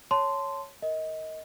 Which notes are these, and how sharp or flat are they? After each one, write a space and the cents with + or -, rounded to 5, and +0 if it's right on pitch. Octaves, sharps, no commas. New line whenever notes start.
C#5 +0 A5 +0 C6 -10
A#4 +0 D#5 +25